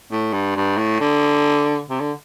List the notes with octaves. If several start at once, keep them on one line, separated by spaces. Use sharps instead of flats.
A2
G2
G2
A2
D3
C3
D3